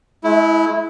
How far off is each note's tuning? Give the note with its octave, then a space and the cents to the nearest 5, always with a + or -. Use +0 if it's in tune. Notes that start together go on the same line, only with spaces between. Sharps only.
G#3 +40 E4 -10